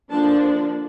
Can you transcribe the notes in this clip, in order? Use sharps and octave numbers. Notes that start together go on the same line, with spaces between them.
D3 F3 A#3 D4 A5